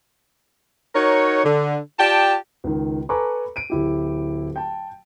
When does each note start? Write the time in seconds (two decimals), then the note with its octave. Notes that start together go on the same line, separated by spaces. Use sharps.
0.95 D#4 F#4 A#4 C#5
1.44 D3
1.99 F4 G4 D5 G5 A5
2.64 C#2 D#3
3.09 A4 B4 G#5 A#5 C#6 D6
3.56 D7 D#7
3.70 D1 E4 G4
4.56 G5 A5